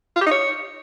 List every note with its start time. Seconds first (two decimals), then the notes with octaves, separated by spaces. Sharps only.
0.16 F4
0.21 G4
0.26 D#4
0.31 C#5